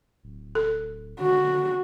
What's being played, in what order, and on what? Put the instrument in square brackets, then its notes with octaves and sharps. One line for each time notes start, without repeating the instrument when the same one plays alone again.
[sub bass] D1
[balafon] A4
[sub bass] D3 [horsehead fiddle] F#4